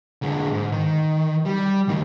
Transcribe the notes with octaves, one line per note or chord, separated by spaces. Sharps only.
D3 G#3
G#2
D#3
G3
D2 D#3